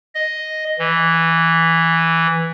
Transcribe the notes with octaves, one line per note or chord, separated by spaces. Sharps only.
D#5
E3